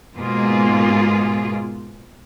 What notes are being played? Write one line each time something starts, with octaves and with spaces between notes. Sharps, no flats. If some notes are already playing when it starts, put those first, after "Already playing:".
G#2 B2 A#3 F4 G#4